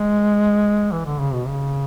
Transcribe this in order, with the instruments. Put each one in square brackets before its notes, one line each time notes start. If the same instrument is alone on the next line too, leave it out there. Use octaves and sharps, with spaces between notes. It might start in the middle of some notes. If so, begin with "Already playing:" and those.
Already playing: [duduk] G#3
E3
D3
C#3
B2
C#3